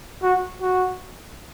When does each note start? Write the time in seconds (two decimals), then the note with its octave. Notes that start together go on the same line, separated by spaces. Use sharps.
0.23 F#4
0.62 F#4